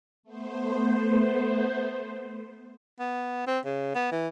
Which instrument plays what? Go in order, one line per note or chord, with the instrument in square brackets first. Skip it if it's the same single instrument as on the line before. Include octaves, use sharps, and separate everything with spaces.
[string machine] A3 B3 C5
[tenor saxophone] B3
C4
C#3
B3
E3